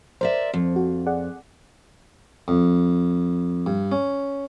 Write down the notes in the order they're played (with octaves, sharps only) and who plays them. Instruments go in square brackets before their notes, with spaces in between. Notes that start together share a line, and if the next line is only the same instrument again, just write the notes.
[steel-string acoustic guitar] A#4 D5 E5 [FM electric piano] C5
[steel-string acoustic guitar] F2
[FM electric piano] F#4
G#4 D5 F#5
[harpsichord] F2
G2
C#4